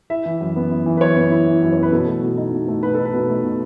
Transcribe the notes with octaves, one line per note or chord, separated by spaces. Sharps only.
E4 E5
E3
F#2
B3
E4
E3
B4
F#2 C#5
B3
E4
E3
F#2
C#5
B3 B4
B2 A4
A3
B2
D#4
B2
A3
B2 B4
D#4 A4
B4
B2
A3
B2